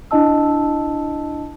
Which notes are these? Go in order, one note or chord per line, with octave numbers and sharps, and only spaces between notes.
D4 E4 D#5 A5 E6